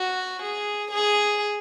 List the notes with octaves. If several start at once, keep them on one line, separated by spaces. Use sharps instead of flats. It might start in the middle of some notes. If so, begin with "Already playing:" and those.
Already playing: F#4
G#4
G#4